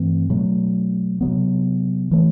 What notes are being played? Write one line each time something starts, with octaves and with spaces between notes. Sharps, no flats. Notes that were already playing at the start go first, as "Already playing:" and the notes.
Already playing: G2 E3 A3 C4
B2 F#3 A3
C3 F#3 B3
E3 A3